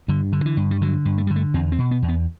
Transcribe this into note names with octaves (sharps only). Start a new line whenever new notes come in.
G2 D3
D3
E3
G2
G3
D3 F#3
G2
A3
D3 G3
A3
E2 C4
C4
B2
B3
E2
B3